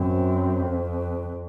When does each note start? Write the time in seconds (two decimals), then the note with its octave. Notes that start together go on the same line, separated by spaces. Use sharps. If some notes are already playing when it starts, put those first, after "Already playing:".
Already playing: F#2 C4
0.60 F2